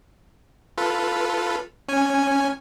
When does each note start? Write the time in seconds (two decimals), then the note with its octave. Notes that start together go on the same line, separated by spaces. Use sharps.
0.78 F4 A4 B4
1.88 C#4 G#5